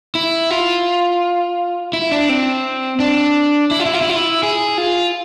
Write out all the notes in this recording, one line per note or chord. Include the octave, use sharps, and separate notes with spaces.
E4
F4
E4
D4
C4
D4
E4
F4
E4
F4
E4
F4
E4
G#4
F4